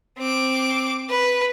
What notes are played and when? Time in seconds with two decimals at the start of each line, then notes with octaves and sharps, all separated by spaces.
0.18 C4 D6
1.10 B4